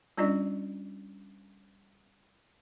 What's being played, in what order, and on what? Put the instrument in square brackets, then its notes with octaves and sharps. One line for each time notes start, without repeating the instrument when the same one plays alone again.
[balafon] G3 C#4 D4 F4 D5 D#5